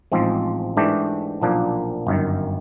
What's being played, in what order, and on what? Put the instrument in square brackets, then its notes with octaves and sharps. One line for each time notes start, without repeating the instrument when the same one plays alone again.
[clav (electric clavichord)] A1 G#2 F3 G#3 C4
G#2 E3 A3 D4 G4
B1 A#2 F3 A#3 D4
G1 F#2 D#3